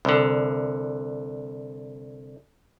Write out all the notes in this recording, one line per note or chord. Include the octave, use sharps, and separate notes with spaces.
C2 D3